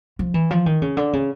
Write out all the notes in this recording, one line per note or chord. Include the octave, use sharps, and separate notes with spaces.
F3
E3
F3
D#3
C#3
D3
C#3